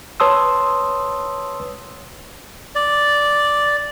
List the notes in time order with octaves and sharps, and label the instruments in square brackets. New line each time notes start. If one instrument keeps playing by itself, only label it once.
[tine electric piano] B4 C#5 A5 C6 D#6 E6
[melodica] D5